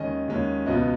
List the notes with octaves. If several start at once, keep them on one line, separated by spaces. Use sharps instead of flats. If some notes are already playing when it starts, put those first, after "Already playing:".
Already playing: D#2 D#3 G#3 C#4 D#5
D#2 D#3 G#3 C#4
C#2 B2 B3 D#5